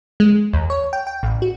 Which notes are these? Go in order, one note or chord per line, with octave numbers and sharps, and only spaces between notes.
G#3
D#2
C#5
G5
G5
A1
F#4